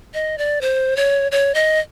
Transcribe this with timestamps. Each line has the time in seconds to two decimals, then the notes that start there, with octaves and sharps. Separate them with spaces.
0.14 D#5
0.38 D5
0.61 C5
0.97 C#5
1.32 C#5
1.54 D#5